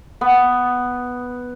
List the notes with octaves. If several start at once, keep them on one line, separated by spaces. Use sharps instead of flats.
B3